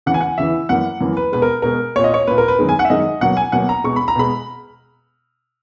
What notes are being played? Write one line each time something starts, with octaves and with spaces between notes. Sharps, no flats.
E2 C#3 E3 F#5
G#5
F#5
E2 C#3 E3 E5
F#2 E3 A#3 F#5
F#2 E3 A#3
B4
B2 G#3 B4
A#4
B2 G#3 A#4
A#2 A#3 C#5
D#5
C#5
A#2 A#3 B4
A#4
B4
F#2 D#3 G#3
G#5
F#5
E5
F#2 D#3 G#3 D#5
B2 F#3 A#3 F#5
G#5
B2 F#3 A#3 F#5
A#5
B2 G#3 C#6
B5
A#5
B2 G#3 B5